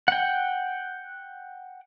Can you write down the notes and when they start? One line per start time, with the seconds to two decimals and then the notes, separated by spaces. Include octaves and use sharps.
0.08 F#5 G5